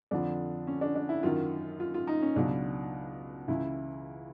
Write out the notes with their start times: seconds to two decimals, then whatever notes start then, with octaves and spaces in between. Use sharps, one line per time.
0.11 F2 D3 F3 D4
0.67 C#4
0.81 D4
0.95 D4
1.09 E4
1.23 F#2 D#3 F#3 F4
1.80 F4
1.94 F4
2.07 D#4
2.22 C#4
2.36 C#2 B2 F#3 D4
3.48 C#2 C#3 E3 E4